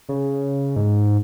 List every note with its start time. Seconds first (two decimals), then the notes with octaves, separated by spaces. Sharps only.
0.09 C#3
0.76 G#2